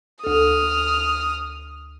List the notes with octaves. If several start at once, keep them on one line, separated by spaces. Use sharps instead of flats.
D2 A4 D#6 F6